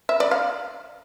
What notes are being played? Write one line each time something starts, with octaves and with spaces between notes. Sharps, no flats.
E5
D5
F5